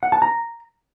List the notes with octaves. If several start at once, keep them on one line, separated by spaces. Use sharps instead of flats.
F#5
A5
A#5